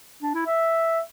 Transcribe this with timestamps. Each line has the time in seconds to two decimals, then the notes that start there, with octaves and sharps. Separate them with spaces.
0.23 D4
0.35 E4
0.47 E5